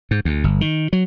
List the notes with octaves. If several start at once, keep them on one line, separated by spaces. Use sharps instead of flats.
G#2
D2
G1
D#3
F#3